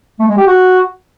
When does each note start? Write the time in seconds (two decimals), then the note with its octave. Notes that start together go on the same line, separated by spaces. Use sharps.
0.19 A3
0.28 G#3
0.37 G4
0.46 F#4